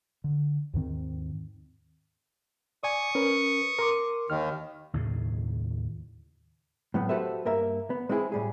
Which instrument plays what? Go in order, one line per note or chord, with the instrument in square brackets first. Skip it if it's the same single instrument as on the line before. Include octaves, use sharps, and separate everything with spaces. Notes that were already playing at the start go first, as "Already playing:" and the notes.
[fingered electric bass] D3
D#2 G#2 D#3 C4
[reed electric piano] D5 G#5 [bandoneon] C#6 D#6
[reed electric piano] C#4 A#4 B4
A#4 C6 D6
[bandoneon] D#2 D#3 [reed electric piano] F6
[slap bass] D#2 A2 C#3
[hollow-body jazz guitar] A2 F#3 B3
F#4 G4 A4 B4 C5 E5
G2 A#3 A#4 E5
B3
G#3 C4 E4 G4 G#4
A2 G3 G#4